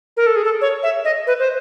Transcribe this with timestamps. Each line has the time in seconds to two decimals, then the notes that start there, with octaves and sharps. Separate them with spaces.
0.17 A#4
0.27 A4
0.36 G#4
0.45 A4
0.61 C#5
0.83 E5
1.05 D#5
1.27 B4
1.39 C5